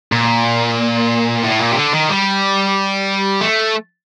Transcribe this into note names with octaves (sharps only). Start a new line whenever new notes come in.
A#2
A2
A#2
C3
D3
D#3
G3
A3